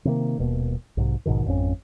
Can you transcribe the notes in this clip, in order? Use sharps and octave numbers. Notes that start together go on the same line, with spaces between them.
C3 D#3 G3 A#3
D#1 B2 A#3
B1 G#2 C3
A#1 G#2 B2 D#3
G#1 F2 C#4